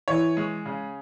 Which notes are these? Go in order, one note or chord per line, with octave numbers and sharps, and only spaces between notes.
E3 C#5
G#3
C#3